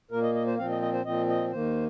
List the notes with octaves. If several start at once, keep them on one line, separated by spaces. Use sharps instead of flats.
A#2 A#3 A#4
D#5
D#5
C5
A#2 F3 C4 F5
D#5
D#5
C5
A#2 F3 C4 D#5
D#5
D#2 D#3 A#3 C5